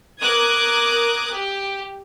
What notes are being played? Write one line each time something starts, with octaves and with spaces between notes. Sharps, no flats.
A#4 D6 D#6 F#6 G#6
G4